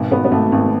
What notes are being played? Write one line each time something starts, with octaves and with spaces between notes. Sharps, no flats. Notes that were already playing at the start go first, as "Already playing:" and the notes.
Already playing: G#1 B2
G#1 B3
B3
G#1 A3
G#1 A3